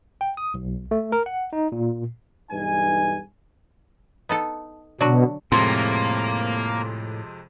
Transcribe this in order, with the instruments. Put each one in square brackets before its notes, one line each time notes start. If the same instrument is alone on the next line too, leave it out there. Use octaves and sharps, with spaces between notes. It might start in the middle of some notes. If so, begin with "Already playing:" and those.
[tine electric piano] G5
D#6
B1
A3
A#4
F#5
D#4
A#2
[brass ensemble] B1 G2 E3 D#4 G#5
[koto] B3 D#4 A4
[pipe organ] B2 [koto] D3 F#3 F#4
[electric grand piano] F2 C3 G#3 [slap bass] A2 [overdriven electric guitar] A#3 [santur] C6